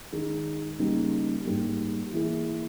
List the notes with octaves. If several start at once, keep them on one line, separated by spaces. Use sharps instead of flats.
D#3 G#3 D#4
C#3 G3 A#3 D#4
G#2 G3 A#3
E3 A#3 E4 G#4